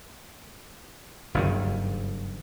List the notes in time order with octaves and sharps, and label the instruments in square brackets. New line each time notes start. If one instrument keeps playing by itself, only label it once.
[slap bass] F#1 G2 D#3